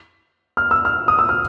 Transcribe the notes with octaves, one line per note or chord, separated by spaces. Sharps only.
F6
E6
F6
D#6
E6
F6